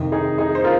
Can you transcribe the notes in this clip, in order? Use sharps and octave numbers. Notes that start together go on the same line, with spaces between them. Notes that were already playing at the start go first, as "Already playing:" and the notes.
Already playing: F2 C3 D#3
D#4 G#4
D#4 G#4
C5
F4 A#4